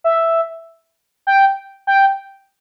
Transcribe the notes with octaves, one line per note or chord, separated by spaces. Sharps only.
E5
G5
G5